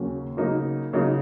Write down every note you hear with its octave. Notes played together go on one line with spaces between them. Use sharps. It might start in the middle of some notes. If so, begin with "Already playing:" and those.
Already playing: D#2 C#3 F#3 A#3 C#4
C#3 F#3 A#3 D#4
C#3 F#3 A#3 D#4